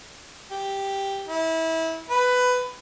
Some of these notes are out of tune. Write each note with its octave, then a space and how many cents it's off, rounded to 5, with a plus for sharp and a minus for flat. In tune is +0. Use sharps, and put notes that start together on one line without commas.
G4 +0
E4 -25
B4 +15